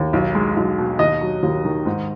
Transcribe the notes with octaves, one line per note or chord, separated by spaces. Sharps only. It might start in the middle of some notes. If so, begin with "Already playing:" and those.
Already playing: D#2
B1
G#3
B1
B2
D#2 D#5
F#3
D#2
D#3
G#2